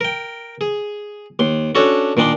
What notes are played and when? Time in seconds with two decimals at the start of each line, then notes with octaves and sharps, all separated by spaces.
0.01 A#4 G5
0.61 G#4
1.39 D#2 C6
1.75 C#4 D4 F#4 A4 C#5
2.17 A#2 D#3 D4 D#4 C6